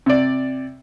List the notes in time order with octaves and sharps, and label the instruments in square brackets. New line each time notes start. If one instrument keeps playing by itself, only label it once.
[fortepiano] C3 D5